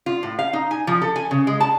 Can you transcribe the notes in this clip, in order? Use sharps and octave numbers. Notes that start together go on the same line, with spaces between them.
F4
A2
F5
D#4
G#5
F3
A4
G#5
C#3
G#3
A5